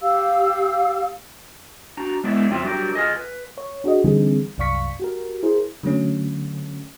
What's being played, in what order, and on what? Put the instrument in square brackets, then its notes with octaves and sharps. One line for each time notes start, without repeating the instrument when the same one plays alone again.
[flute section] G4 F5 E6
[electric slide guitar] D4 F#4 A#5
G#3 B3 D4 E4 C#5 E5
F2 C4 F4 E5
F#3 G3 D4 G4 A#4
F4 G#4 D#5
B4
[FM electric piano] C#5
D4 F#4 G#4 D#5
D3 E3 G3 C4 D#4 G#4
C2 F#2 D5 F5 C#6 B6
F#4 G4 A#4
E4 G#4 A#4 C5
D3 F#3 A3 C#4